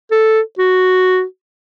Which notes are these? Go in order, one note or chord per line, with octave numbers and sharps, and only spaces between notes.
A4
F#4